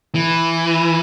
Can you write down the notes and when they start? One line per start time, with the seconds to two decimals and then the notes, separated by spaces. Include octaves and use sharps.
0.15 E3